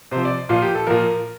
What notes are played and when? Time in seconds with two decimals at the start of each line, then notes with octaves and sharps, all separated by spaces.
0.11 C3 F3 C5
0.25 D5
0.49 A#2 F3 F4
0.62 G4
0.75 A4
0.87 A#2 F3 A#4